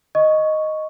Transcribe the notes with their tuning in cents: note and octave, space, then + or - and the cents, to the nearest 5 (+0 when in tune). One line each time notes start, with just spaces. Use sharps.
D#5 +0 C#6 +0